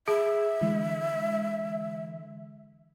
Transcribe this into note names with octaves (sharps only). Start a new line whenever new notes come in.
G#4 E5
D3 E3 G#3